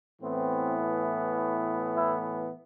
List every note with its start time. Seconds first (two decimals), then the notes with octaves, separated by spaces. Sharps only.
0.21 A2 E3 B3 C4
1.94 E4